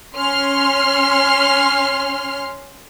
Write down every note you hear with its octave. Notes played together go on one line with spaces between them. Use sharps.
C#4 C6 F6